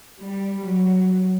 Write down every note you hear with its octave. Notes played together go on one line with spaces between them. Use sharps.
G3
F#3